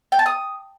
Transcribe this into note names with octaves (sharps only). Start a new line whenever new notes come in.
G5
A5
D#6